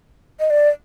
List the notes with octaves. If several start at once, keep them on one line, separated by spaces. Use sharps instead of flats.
D#5
D5